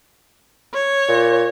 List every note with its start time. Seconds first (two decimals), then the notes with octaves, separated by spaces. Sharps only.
0.74 C#5
1.08 A#2